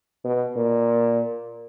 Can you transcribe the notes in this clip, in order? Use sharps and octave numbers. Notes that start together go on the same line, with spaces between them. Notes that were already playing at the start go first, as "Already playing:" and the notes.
B2
A#2